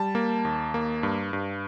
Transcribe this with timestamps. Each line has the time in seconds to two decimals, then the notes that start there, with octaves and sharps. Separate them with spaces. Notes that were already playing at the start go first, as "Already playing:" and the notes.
Already playing: G3 A5
0.15 A#3
0.45 D#2
0.74 A#3
1.03 G2
1.33 G2